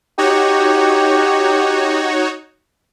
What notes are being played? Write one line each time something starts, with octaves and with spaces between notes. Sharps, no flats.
D#4 F#4 G4 C#5